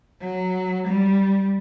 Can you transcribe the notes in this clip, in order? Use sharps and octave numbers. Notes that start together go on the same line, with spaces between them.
F#3
G3